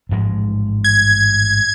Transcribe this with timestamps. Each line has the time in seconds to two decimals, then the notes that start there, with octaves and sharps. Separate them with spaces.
0.09 A1 G#2 F3 G#3
0.84 G#6